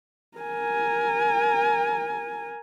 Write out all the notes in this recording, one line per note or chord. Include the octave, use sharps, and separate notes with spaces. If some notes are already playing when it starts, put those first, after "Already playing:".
A#4 G#5